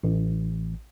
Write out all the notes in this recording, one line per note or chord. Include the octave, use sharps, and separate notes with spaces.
A1